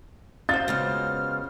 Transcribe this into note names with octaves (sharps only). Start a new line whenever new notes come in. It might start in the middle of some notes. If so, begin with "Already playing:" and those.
F4 F#4 C5 A6
C#3 G#3 B3 F6